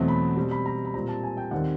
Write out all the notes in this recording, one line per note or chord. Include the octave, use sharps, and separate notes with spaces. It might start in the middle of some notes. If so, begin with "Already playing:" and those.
Already playing: E2 B2 F#3 A3 C4
B5
B2 G3 C4
B5
A#5
B5
A#2 G3 C4 A#5
A5
G#5
G5
D#2 D#3 G3 C4 F#5